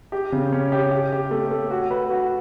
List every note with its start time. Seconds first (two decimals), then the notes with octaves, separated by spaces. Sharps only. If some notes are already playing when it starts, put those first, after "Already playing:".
0.12 G4
0.32 C#3
0.53 C#4
0.72 G4
0.91 G4
1.12 G4
1.31 A3
1.51 A3
1.71 F#4
1.91 B4
2.10 F#4